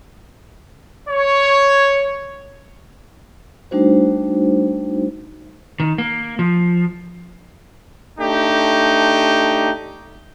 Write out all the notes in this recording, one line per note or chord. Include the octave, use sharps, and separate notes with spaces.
C#5
G3 A3 D4 D#4 F#4 C5
D#3
A#3
F3
A3 D4 D#4 G4